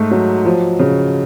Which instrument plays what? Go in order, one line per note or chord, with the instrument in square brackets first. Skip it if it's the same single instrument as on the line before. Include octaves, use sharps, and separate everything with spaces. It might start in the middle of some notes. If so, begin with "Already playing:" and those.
Already playing: [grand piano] G#2 A3
F#3
F3
C#3